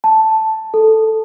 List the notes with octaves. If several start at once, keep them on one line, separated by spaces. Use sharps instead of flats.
A5
A4